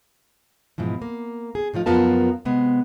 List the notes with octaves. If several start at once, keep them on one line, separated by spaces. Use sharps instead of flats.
G#2 B2 E3 F3
A#3
G#4
A2 D#3 F3 F4
F#2 F3 B3 F4 A#4 A5
C3 G#3 B3